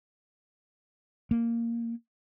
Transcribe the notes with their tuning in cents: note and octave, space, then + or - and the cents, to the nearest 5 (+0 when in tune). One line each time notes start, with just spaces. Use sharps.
A#3 -5